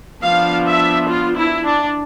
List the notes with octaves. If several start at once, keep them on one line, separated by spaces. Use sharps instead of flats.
F3 B3 D4 F5
E5
F4
E4
D4